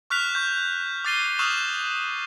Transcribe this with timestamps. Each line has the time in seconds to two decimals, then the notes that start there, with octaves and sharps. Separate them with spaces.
0.10 C#6 F6 F#6 B6 F7
0.34 C#6 G6 B6
1.04 D6 F6 A6 C7 D#7 G7
1.39 C#6 D#6 F6 F#6 E7 F7